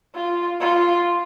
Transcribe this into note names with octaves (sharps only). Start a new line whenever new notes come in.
F4
F4